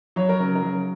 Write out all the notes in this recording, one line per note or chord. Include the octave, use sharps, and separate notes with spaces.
F#3 C#5
A#4
C#3
A#4
F#3